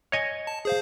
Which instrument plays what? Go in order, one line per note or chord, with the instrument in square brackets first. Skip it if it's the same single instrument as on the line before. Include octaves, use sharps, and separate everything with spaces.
[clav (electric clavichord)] C#5 D#5 G#5
[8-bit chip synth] A5
G#4 C5 F5